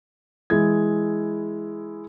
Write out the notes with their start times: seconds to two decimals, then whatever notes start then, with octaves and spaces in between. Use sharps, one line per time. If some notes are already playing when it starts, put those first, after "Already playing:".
0.50 E3 G#3 E4 G#6